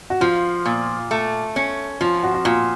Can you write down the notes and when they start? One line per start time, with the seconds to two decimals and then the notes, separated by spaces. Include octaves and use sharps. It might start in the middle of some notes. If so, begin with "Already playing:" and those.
0.10 F#4
0.21 F3 F4
0.66 A#2
1.11 A3
1.56 C#4
2.00 F3 F4
2.23 F#4
2.34 F#4
2.45 A#2 F4